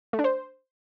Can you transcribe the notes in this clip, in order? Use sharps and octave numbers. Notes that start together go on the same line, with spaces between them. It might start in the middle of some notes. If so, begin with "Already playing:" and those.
A3
D4
C5